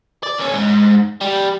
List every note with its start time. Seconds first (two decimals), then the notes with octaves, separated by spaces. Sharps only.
0.23 D5
0.38 D#2 C#4
0.53 G#2
1.21 G3